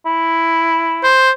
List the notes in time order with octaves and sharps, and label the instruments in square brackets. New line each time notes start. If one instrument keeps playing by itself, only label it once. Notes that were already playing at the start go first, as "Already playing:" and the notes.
[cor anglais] E4
[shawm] C5